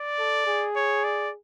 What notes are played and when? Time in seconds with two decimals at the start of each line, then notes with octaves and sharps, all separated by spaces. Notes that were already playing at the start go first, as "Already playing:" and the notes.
Already playing: D5
0.19 A4
0.47 G#4
0.76 C#5
1.04 D5